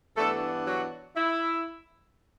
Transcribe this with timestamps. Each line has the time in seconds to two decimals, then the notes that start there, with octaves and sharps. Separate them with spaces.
0.16 G2 E3 A3 B3 D4 A4
0.66 F#3 F#4
1.17 E4